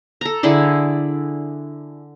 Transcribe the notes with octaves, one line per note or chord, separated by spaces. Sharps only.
A4 A#5
D3 E4 G#4 D5